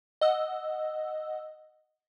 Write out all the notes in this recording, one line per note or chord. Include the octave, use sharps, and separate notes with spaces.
D#5 F#5 E6